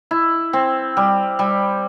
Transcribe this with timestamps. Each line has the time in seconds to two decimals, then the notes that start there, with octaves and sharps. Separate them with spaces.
0.11 E4
0.53 C4
0.97 G3
1.39 G3